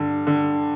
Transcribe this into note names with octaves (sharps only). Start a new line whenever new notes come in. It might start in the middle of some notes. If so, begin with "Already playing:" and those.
Already playing: G2 D3
D3